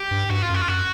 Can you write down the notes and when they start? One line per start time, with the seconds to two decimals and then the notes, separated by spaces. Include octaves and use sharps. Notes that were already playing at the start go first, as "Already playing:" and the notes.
Already playing: G4
0.11 G2
0.30 G2 F#4
0.42 F4
0.49 F#2
0.54 F#4
0.61 F4
0.68 F#2 F#4